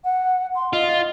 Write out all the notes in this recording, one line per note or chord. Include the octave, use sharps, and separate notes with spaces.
F#5
C6
F4 D#5